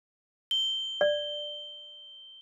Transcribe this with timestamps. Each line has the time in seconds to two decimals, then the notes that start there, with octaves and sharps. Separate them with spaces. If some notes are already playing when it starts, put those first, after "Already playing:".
0.51 G7
1.01 D5